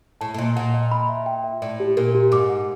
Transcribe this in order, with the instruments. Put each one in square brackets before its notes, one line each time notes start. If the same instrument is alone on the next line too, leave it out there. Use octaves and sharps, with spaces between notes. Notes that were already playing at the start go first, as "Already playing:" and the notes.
[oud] A2 [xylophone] A5
[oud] A2
[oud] A#2 [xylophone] D#5
[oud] A#2 [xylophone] F#5
[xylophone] D#5
B5
E5
G5
E5
[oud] A2 [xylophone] D5
[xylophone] G4
[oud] A#2 [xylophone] A#4
[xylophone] G4
[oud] G#2 [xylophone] D6
[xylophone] F#5